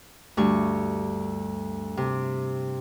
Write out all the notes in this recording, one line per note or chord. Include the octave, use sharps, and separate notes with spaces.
D2 G2 C#6
C3